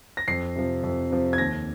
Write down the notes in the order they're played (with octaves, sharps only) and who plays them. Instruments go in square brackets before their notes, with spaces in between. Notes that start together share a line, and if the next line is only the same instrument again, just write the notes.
[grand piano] A#6
F2 C7
C3 F3
F2
C3 F3
G#6
D#2 A#6